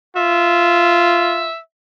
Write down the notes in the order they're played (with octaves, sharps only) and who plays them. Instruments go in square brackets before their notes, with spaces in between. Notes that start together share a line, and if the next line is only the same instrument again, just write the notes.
[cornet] F4 [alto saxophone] E5